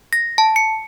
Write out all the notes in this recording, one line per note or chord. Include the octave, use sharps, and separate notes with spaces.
A#6
A5
C#7